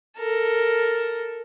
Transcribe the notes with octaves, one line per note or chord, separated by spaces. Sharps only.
A4 A#4